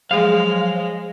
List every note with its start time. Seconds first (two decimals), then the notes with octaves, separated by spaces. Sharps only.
0.11 F3 F#3 G#3 F5